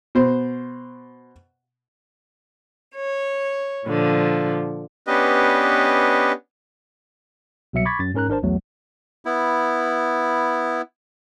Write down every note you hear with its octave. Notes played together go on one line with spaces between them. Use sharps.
B2 C5
C#5
A#2 D3 F3
B3 C#4 D4 G4 B4 D#5
C2 B2 F#3 E5 C#7
B5 C#6 D6 G#6 A6 B6
F#2 A6
G#2 C#4 A#4 A#5 F#6
G#1 D4 A#4 C5 A5
B1 E2 F#3 A3
B3 E4